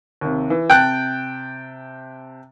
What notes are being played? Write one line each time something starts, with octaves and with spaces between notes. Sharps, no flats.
D#2 C3
E3
C3 G5 A5 F#6 A6